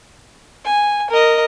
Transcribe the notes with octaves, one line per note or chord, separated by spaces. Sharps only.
G#5
A#4 D#5